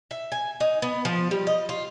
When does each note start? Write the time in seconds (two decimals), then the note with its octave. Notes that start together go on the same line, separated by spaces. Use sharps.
0.11 E5
0.32 G#5
0.60 D#4
0.82 B3
1.05 F3
1.31 G3
1.47 D#5
1.69 F4